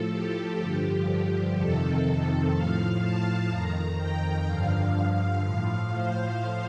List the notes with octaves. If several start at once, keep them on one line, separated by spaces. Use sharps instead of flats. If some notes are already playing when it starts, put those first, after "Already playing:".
Already playing: A2 F3 A4
G4
G2 D3 F3 G4
F2 C3 D#3 A4
A2 F3 F5
A5
F2 D#3 A#5
G5
G2 D3 F3 F5
F5
A2 F3
C5